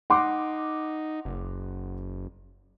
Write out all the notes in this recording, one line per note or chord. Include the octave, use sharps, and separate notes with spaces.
D#4 F#5 C6 D6
F#1